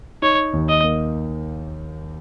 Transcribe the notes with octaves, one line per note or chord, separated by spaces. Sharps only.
D#4 C#5
D#2
D#5
A#3